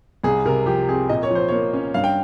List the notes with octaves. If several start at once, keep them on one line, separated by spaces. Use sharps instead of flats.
C2 G#4
C3 A#4
F3 G4
C4 G#4
A#2 D#5
C#5
F3 C5
A#3 C#5
C#4
G2 F5
G5